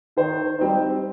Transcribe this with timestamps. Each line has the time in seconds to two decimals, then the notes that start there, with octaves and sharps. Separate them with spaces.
0.17 D#3 C5
0.58 G3 C4 D#4